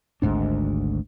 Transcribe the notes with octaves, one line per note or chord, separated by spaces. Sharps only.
G#1 D2 G#2 D4